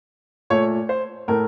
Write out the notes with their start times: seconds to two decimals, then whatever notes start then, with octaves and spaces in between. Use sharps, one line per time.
0.50 A#2 A3 C#5
0.89 C5
1.28 A2 A3 A#4